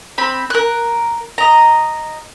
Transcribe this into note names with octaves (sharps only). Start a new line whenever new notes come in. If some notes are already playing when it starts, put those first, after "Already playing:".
C4 B5
A#4 F#6
D#5 A#5